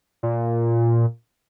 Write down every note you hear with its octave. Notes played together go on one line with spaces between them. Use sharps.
A#2